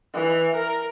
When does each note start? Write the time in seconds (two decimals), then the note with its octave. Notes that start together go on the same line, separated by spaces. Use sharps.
0.14 E3
0.56 A#4